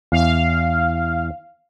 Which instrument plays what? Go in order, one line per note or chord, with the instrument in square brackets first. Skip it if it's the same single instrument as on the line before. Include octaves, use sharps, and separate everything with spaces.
[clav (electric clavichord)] E2 [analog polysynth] F5